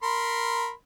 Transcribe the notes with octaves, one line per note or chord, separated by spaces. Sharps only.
A#4 B5 C6